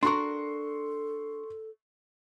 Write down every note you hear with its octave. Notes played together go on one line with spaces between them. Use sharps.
D4 F#4 A4 A#4 C6 C#6